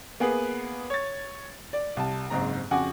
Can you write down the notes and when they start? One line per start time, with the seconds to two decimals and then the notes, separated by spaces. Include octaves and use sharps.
0.20 A#3 B3 G#4 B4
0.90 C#5 A6
1.73 D5
1.97 C2 A5
2.30 F#1 G#2 C4 A#5
2.71 F2 C#3 F#4 F#5 G#5 D6